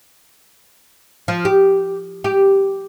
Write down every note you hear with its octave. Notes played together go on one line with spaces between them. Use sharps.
F3
G4
G4